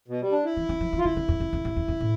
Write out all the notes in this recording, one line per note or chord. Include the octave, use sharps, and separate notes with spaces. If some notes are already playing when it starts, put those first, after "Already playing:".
B2
G3
D4
E4
E3
F3
F3
E3
F4
D3 E4
D3
F2
F2
F2
G2
F2
F2
A2